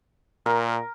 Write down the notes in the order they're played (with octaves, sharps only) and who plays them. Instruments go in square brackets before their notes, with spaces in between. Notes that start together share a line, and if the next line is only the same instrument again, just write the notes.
[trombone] A#2 [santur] A#4